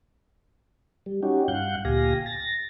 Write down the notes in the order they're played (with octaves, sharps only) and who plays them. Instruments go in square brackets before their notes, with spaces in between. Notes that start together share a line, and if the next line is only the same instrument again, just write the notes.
[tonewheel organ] G3
C#4 D#4 F#4 G4
G2 F5 F#5 F#6 G6
D2 A#2 G4 F5 G#5 A#6
A6 A#6